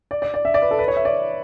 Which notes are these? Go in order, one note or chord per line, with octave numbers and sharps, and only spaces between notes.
D5
D5
D5
E5
D5
B4
A4
B4
C#5
E5
D5